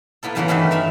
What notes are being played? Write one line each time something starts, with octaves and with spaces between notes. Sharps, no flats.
A#3 B3 E4 A4
F#2 C#3 E3 A#3 B3 F#5
G2 D#3 E3 A3 F#4 B4
A#4 E5 F5 B5